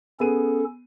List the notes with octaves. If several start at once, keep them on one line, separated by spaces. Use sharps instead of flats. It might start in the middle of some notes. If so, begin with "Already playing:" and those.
B3 C#4 G#4 A4 D#7